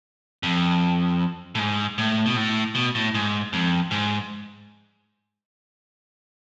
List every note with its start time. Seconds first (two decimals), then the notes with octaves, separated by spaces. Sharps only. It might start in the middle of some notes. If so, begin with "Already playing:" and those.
0.43 F2
1.55 A2
1.59 G#2
1.98 A2
2.26 B2
2.36 A2
2.75 B2
2.95 A2
3.14 G#2
3.53 F2
3.91 G#2